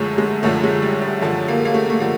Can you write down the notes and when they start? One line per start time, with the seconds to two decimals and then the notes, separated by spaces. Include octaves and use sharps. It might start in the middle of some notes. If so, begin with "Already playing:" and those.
Already playing: F#2 D3 F3 G#3 A3
0.18 G#3
0.43 F#2 D3 F3 A3
0.64 G#3
0.82 G3
1.01 G3
1.22 F#2 D3 F3
1.48 A#3
1.65 A#3
1.74 A3
1.90 A3
2.00 D3 F3 A#3